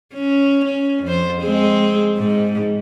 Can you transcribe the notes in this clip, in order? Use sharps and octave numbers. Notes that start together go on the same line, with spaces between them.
C#4
C#4
F2 C5
G#3 C4 G#4
G#2